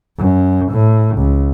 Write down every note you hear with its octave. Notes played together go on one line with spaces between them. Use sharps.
F#2
A2
C#2